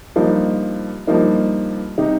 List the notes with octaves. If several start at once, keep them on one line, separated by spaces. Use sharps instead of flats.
G2 F3 A#3 D#4
G2 F3 A#3 D#4
C3 G3 D#4